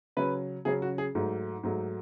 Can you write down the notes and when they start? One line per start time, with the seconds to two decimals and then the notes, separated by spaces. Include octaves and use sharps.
0.17 C#3 F#3 C#4 B4
0.65 C#3 F#3 C#4 G#4
0.82 F#4
0.98 G#4
1.15 G#2 F#3 A3
1.63 G#2 F#3 A3